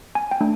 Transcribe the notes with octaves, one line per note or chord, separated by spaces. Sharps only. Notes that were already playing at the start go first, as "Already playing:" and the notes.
G#5
G5
A3 D4